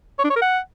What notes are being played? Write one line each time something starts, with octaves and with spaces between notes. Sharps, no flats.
C#5
D4
C#5
A#4
F#5